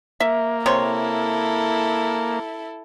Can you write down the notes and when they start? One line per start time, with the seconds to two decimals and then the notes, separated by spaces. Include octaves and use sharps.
0.20 A#3 E5
0.66 C3 E4 A4 C#5 C6